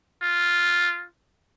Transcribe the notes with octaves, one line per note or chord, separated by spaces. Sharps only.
F4